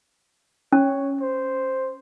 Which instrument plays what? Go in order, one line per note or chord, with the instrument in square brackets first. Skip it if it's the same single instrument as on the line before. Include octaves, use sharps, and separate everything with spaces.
[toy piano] C#4 [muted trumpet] C#5
[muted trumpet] C5